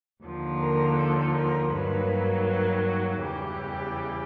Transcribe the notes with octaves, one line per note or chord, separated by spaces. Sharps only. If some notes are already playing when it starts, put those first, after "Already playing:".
D#2 D3 F3
A#4
A4
A#4
G2 D#3 F#3 A#3 B4
B4
F#4
E2 C#3 E3 G3 G4